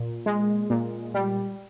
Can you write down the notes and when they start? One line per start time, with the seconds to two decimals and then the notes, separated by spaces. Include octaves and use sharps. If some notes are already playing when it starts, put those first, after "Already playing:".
Already playing: A#2
0.26 G#3
0.70 A#2
1.14 G3